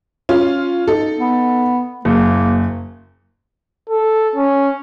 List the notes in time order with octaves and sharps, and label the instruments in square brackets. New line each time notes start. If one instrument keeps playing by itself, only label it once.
[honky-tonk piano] C#4 F4
D#4 A4
[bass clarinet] B3
[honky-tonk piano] F#1 [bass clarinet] A#3
[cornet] A4
C#4